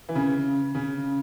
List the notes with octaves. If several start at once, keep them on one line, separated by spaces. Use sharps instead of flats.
E3
C#3
C#3